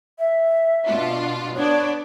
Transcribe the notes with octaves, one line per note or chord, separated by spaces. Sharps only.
E5
B2 D4 F4
B3 D4 C#5 D5